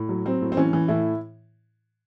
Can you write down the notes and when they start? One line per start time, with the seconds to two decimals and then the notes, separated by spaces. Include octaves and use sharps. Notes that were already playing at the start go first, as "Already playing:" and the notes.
Already playing: A2
0.09 F#3
0.25 F#3 C4
0.42 A2
0.52 C4
0.57 E3 C#4
0.73 E3
0.88 A2 E4